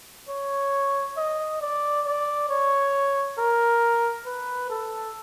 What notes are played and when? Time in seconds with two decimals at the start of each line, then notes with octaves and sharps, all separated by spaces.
0.29 C#5
1.17 D#5
1.61 D5
2.06 D5
2.49 C#5
3.38 A#4
4.26 B4
4.70 A4